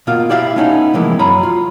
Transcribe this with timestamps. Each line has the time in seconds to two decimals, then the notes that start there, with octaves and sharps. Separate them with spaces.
0.07 B2 A#3 F4 F5
0.29 E4 G4 D5 E5 F5
0.56 A3 B3 C#4 D#4
0.94 C3 E3 F3 G#3 A#3 E4
1.19 F#2 C#5 A#5 B5
1.43 F4